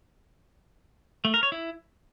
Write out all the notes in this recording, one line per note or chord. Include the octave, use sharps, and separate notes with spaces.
A3
A#4
C#5
E4